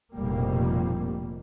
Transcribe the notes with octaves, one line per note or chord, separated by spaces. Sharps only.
F1 A#1 F2 B2 G3 A#3